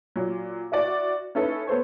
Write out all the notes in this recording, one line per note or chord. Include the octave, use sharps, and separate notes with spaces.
A#2 F#3
E4 F#4 D5
C#4 D#4 E4 A4 B4
B3 A4 C5 C#5